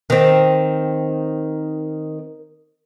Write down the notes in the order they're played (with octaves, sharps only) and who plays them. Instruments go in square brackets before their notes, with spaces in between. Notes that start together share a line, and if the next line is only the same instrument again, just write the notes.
[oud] D#3 C4